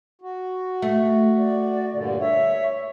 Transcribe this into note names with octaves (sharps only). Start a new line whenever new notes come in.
F#4
A3
D5
G2 A#2 D3
C#5 E5